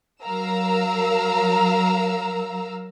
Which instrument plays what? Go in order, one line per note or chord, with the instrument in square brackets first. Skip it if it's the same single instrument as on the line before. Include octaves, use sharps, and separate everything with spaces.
[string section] F#3 A#4 F5 A#5 E6